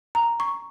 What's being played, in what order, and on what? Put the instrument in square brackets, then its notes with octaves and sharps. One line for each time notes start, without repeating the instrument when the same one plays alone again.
[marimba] A#5
C#6